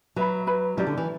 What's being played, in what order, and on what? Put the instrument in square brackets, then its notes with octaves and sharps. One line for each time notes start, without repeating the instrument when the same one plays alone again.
[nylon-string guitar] F#3 [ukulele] B4 E5 B5
[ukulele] B4 E5 B5
[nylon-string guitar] F#3 [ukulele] C#4 E4 G4 D5
[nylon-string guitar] D3
E3